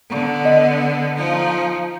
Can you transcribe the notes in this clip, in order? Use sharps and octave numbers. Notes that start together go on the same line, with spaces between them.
D3 B3
D#5
F3 D#4